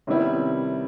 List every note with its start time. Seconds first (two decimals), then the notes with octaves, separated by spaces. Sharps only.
0.07 C3 D#3 G3 B3 C#4 E4